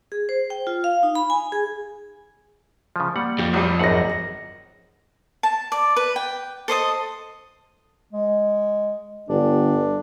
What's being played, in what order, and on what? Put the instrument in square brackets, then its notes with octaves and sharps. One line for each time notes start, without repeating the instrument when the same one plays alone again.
[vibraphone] G#4
C5
G5
F4
F5
D#4
B5
G#5
G#4
[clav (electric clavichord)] C#3 F3
[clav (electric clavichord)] G3 F#5 [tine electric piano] A#3
[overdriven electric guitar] F2 [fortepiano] G4
[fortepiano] A#1 G3 [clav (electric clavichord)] F3
[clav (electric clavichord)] G#1 F#2 F#5 [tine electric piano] D#5 A#6
[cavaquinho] A5
D5
B4
G5
A4 C5 D#5 D#6
[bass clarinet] G#3
[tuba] G1 [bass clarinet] D4